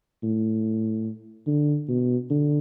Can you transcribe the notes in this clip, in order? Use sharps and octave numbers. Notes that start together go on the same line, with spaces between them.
A2
D3
B2
D3